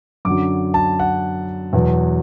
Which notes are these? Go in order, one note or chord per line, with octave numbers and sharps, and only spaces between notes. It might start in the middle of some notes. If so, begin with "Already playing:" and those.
F#2 D3 F#3 D6
A5
F#5
E2 B2 F#3